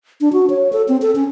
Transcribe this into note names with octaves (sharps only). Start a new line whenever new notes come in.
D4
F#4
C#5
A4
C4
A4
C#4